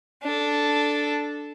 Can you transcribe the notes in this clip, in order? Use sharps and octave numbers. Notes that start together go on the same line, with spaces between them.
D4 A4